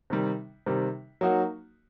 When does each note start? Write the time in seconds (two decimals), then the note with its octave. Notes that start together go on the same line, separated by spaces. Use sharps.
0.10 C3 D#3 G3
0.66 C3 D#3 G3
1.21 F#3 A#3 D#4 F#4